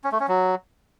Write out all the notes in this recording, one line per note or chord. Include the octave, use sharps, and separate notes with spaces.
C#4
A3
C#4
F#3